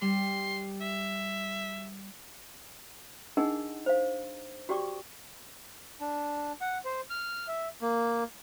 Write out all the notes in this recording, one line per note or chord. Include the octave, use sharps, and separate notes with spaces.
G3 C6
E5
D4 D#4 G#4 A#4 D#5 F#5
C5 F5
F#4 G4 D5 G5 C#6 D6
D4
F#5
C5
F6
E5
A#3